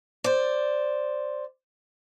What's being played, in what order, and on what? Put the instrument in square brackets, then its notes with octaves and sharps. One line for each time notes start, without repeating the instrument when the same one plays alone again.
[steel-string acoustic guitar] C5 D5